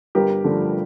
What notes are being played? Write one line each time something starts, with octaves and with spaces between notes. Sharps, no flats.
G1 G4 A#4
G2 D3 F3 A3